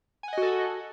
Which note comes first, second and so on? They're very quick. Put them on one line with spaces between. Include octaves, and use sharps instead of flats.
G#5 F#5 D#5 F#4 A4